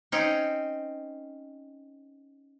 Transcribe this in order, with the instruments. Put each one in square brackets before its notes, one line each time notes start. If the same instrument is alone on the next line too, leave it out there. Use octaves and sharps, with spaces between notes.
[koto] C4 C#4 D#4